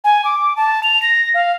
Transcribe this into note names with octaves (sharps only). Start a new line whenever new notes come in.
G#5
D6
A5
F7
A#6
F5